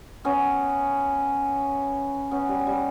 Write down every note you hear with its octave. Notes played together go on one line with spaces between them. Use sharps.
B3 C#4
B3 C#4
G3
G3